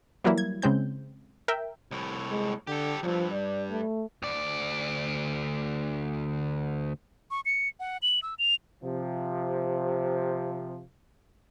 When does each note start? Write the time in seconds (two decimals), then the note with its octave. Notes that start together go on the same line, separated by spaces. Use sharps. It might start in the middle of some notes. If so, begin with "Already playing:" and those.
0.24 E3 F#3 G3 A#3 E4
0.38 G#6
0.62 C#3 G#3 C4 G6
1.48 A#4 E5 G5
1.91 C2 A2
2.31 G#3
2.67 D3 G4 A4
3.03 E2 G2 F3
3.33 D5
3.70 A3
4.23 D2 D5
7.31 C#6
7.45 C#7
7.80 F#5
8.02 F#7
8.22 E6
8.39 F7
8.83 C3 F3